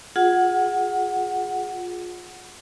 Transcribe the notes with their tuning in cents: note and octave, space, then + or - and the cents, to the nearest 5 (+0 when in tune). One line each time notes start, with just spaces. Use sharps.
F4 +25 G#4 +0 F#5 +0